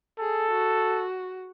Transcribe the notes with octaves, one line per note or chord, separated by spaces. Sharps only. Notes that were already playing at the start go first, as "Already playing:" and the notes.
G#4 A4
F#4